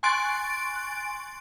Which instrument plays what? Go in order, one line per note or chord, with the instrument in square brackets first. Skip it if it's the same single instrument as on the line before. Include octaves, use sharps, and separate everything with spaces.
[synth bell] G#5 C6 C#6 F#6 A6 D7